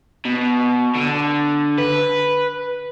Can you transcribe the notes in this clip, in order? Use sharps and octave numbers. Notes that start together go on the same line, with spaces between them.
B2
D3
B4